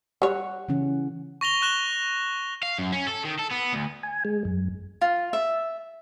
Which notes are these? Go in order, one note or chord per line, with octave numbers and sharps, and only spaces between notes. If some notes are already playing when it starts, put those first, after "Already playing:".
G3 C#5 F#5
C#3 E3 C#4
C#6 A#6 F7 G7
C#6 F#6 E7 G7
F5
F#2
C#4
A4
D#3
A4
B3
D2
G#5
G#3
F#2
F4
E5